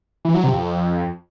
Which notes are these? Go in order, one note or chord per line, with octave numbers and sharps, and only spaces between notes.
E3
F#3
C3
F2